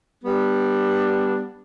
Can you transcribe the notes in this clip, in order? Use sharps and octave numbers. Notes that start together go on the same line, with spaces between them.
G3 B3 D4